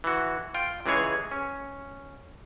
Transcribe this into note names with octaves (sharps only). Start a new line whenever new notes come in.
E3 F#4
F4 G5
C#2 E3 G#3 G#4 C#5 G#5
C#4